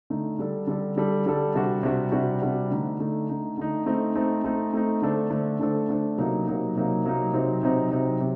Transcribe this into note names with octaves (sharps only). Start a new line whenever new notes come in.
D3 A3 D#4
D3 G3 D4 A4
D3 G3 D4 A4
D3 G3 D4 A4
D3 G3 D4 A4
C3 G3 D4 F#4
C3 G3 D4 F#4
C3 G3 D4 F#4
C3 G3 D4 F#4
D3 A3 D#4
D3 A3 D#4
D3 A3 D#4
D3 A3 D#4
A3 C4 D#4
A3 C4 D#4
A3 C4 D#4
A3 C4 D#4
D3 A3 D4 A4 C5
D3 A3 D4 A4 C5
D3 A3 D4 A4 C5
D3 A3 D4 A4 C5
C3 F#3 A#3 D#4
C3 F#3 A#3 D#4
C3 F#3 A#3 D#4
C3 F#3 A#3 D#4
C3 F#3 C4 D#4
C3 F#3 C4 D#4
C3 F#3 C4 D#4
C3 F#3